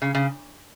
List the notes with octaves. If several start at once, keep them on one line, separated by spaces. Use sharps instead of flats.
C#3
C#3